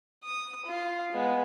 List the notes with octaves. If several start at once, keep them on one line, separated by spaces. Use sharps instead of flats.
D#6
F4 F5
G#3 B3